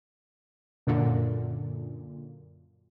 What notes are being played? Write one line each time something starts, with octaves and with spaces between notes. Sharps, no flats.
F#2 A#2 D3